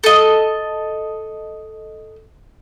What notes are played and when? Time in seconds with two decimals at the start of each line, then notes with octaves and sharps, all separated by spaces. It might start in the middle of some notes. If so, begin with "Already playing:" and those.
0.04 A4 D#5